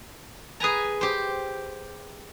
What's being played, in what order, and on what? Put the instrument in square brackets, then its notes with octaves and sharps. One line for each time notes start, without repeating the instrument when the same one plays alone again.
[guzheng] G#4 B4 G#5 A#5
G4 C5